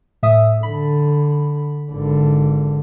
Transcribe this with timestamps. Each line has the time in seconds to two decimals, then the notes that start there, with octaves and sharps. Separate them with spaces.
0.23 A2 E5 D#6
0.63 D3 B5
1.92 G#1 D3